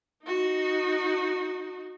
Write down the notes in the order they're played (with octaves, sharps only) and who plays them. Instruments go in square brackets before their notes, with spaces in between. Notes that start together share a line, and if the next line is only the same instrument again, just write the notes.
[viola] D#4 F#4